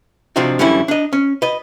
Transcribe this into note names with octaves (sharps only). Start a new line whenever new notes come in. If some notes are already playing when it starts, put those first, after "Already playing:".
C3 F3 C4 D4 D#4 F#4
F#2 D3 E3 G3 C#4 E4
D4 D#5
C#4
B4 D#5